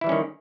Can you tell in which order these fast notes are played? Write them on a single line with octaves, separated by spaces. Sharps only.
E4 E3 G3 C#4 D#3